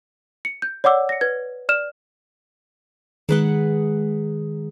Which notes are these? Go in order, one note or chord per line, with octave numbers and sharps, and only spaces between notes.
C#7
G6
C#5 D5 F#5 D6 E6
A#6 C#7
B4 G#6
D5 F6 E7
D#3 G#3 G#4 B4 F#5